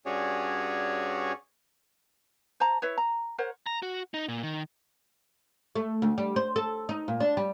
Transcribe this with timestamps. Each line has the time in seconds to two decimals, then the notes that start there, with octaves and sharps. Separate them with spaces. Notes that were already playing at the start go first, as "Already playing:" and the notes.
0.06 G2 C#4 F#4 G#4 C#5 D5
2.60 C5 A5 A#5
2.82 E4 B4 C#5
2.98 A#5
3.38 A#4 C5 C#5 F#5
3.67 A#5
3.82 F#4
4.14 D#4
4.28 A#2
4.43 D#3
5.75 A3
6.02 D2
6.18 G3
6.36 C5
6.56 A4
6.89 D#4
7.08 A#2
7.20 D4
7.37 G3